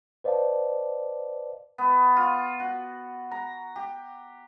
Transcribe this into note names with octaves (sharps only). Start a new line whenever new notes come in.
B4 C5 D5 D#5 F5 A5
B3
F4
F#4
A#5
G4